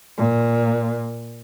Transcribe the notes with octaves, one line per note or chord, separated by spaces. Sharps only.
A#2